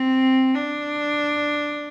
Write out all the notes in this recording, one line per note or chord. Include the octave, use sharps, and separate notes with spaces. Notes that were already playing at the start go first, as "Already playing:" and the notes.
Already playing: C4
D4